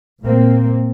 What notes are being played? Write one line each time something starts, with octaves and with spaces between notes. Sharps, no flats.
A#2 A#3 C4